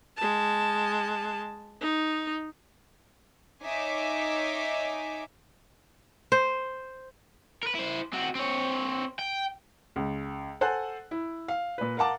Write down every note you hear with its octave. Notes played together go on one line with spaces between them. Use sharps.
G#3 A5
D#4
D#4 C#5 E5 G#5 D6
C5
A#4 B4
E4 C5
C4 F#4
C4 C#5
G5
C#2
A4 C5 F#5 G#5 A5 F#6
E4
F5
A#2 B4
A#4 F5 F#5 A5 D6